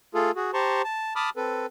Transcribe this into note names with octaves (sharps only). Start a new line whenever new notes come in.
A3 F4 G#4 A4
F#4 G#4
G4 C5 A5 A#5 C6 C#6
A5
A5 B5 D6 D#6 F6
C4 A4 B4